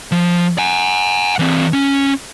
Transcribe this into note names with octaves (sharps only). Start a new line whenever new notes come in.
F3
F#5 G#5
E3 C4
C#4